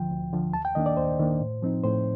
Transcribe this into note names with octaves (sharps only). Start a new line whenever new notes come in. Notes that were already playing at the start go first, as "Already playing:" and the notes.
Already playing: D2 D3 F3 G5
D2
D3 F3
D#2 A5
G5
D#3 A#3 D4 D#5
D5
D#2 C5
D#3 A#3 D4
A2
F3 C4 D#4
A2 C5